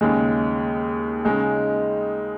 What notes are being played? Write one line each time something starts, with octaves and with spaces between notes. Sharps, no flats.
D#2 C#3 G#3
C#3 G#3 D#4